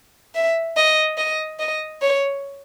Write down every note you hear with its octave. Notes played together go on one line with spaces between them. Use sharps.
E5
D#5
D#5
D#5
C#5